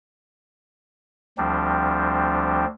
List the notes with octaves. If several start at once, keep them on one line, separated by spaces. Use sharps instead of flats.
D2 F3 G3 C4 D4